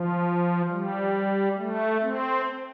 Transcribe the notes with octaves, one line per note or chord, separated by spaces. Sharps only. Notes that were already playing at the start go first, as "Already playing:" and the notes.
Already playing: F3
G3
A3
C4